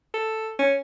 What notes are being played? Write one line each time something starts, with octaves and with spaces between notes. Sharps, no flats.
A4
C#4